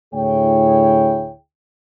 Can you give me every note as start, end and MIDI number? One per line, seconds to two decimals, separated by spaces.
0.14 1.32 38
0.14 1.32 45
0.14 1.32 64
0.14 1.32 68
0.14 1.32 73
0.14 1.32 79